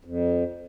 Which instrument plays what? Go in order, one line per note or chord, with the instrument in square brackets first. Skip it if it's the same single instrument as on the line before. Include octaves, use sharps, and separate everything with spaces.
[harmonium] F2